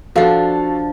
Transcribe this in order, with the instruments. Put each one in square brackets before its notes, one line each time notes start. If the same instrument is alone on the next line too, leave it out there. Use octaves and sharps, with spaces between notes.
[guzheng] F3 D4 [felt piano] F#4 A4 F5